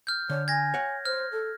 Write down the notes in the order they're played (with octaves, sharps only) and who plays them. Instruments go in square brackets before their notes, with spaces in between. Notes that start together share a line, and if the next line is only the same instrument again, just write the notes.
[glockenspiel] F6 G6
[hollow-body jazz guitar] D3 [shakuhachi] C#5
[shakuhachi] G#5 [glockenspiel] G#6 A#6
[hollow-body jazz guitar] C#5 F#5
[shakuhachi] C5 [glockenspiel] F6
[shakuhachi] A4